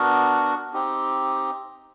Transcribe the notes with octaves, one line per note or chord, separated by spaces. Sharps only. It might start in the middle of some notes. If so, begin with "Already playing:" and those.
Already playing: B3 D4 F#4 A#4
C4 D#4 G4